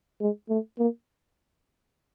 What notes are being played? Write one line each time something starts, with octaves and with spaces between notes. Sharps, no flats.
G#3
A3
A#3